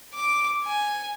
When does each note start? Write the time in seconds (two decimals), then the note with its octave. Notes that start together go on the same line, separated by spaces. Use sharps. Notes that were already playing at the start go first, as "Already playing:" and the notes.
0.14 D6
0.65 G#5